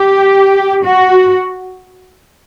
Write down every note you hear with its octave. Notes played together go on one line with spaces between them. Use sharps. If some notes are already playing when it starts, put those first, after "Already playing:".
Already playing: G4
F#4